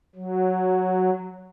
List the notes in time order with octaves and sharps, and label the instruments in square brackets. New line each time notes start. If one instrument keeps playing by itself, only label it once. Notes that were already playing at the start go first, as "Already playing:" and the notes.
[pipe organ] F#3